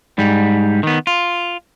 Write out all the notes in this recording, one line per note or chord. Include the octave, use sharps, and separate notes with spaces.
G#2 G3
D#3 B3
F4